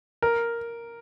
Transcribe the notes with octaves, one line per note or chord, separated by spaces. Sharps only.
A#4